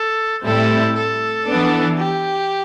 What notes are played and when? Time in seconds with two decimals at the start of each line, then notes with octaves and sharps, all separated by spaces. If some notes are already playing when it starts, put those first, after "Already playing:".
Already playing: A4
0.45 A2 G3 C4 E4 A4
0.96 A4
1.47 E3 B3 D4
1.98 G4